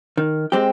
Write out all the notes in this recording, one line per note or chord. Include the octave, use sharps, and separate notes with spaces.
D#3
G#3 C4 G4